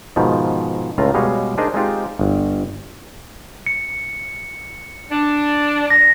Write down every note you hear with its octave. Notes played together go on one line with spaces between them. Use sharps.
G#2 B2 D#3 F3
C#2 A2 F4 A#5
B2 G3 G#3 C#5 D#5 F5
D4 D#4 G#4 A#4 C5 D#5
G#3 C4 D#4 F4 G4
G1
C#7
D4
A#6